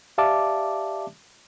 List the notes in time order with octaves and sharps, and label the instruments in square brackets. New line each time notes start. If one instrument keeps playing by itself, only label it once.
[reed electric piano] G4 D5 E5 F5 A5 D6